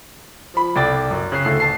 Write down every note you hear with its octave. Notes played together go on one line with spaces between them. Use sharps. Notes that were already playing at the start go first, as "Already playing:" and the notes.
F3 B5
C2 A4 D5 G5 D6 A6
F#2
C#3 F#6 C7
D2 E4 A4 C7
A1 A5 C7